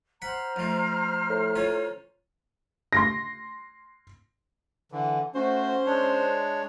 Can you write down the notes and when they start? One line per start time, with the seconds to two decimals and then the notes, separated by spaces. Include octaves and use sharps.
0.22 C5 F#5 A#5 B5 F6
0.56 F2 A3
1.30 A2
1.56 C#4 F4
2.93 C6 A#6
4.92 D3 E3
5.35 A3 C#4 F#4 C5
5.86 G#3 D4 C#5